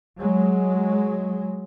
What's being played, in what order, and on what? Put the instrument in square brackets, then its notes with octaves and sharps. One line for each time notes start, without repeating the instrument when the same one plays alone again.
[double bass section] F#3 G#3